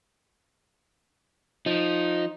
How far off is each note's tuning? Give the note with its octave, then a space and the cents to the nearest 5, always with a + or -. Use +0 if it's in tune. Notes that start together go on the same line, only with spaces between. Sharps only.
F3 +15 D#4 +0